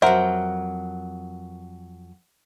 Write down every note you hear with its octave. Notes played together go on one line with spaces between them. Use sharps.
F2 F#3 A#4 C5 E5 F#5